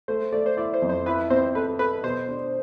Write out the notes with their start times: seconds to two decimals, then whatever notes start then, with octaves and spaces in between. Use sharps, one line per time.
0.08 A3 C5
0.32 A3 D5
0.46 C5
0.57 E4 D5
0.74 C5
0.82 F2
0.90 C5
1.06 E4 B4
1.30 C4 C5
1.55 A4 B4
1.79 A4 B4
2.03 B2 C5
2.28 D4